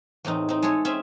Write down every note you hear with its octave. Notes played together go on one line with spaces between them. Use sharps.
E2 A2 C4 D#4
C4 D#4
G#3 E4 G#4 A4 C#5
C4 C#4 G#4 E5